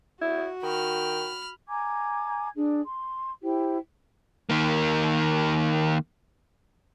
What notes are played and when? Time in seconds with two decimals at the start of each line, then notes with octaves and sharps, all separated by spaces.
0.21 E4 F#4
0.63 D#3 G5 B5 F6
1.68 G#5 A#5 D6 G#6
2.55 D4 G#4
2.85 C6
3.43 E4 G4 C5 G5
4.50 D#3 A#3